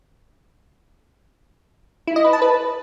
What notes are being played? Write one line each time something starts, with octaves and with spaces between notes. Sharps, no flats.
E4
D#5
B4
A5
B4